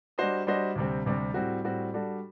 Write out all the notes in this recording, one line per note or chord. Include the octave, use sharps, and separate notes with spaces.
G3 D4 F#4 C5 D#5
G3 D4 F#4 C5 D#5
D2 C3 G3 C4
D2 C3 G3 C4
A2 G3 C4 F#4
A2 G3 C4 F#4
G3 D4 F#4 A4